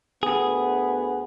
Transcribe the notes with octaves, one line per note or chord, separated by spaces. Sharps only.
D2 B3 G#4